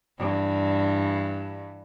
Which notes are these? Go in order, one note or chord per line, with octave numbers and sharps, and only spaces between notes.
G2 E3